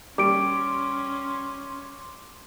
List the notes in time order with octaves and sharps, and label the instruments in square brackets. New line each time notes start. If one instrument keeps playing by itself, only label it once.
[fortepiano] G3 [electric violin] C#4 [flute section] C6 [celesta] D6 D7